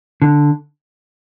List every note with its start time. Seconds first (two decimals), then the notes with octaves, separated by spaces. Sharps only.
0.22 D3